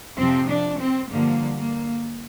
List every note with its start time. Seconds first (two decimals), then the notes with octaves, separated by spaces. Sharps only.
0.17 F2 C3 F3 C4
0.48 D4
0.79 C4
1.10 G2 D3 F3 A#3
1.57 A#3